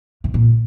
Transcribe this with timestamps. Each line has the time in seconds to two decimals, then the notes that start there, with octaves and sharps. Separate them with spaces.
0.24 C3
0.34 A#2